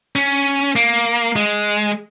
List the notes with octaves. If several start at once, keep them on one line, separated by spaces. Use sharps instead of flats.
C#4
A#3
G#3